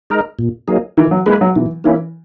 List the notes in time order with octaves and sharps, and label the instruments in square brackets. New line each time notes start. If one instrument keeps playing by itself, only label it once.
[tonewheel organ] G#3 D#4 A#4
A#2
F#3 A#3 D#4 G#4
[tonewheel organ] D#3 [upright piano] E3
[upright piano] F#3
[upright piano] G#3 [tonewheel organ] A#3 E4 B4
[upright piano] F#3
[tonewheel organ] B2 [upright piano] E3
[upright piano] E3 [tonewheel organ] A#3 C#4 E4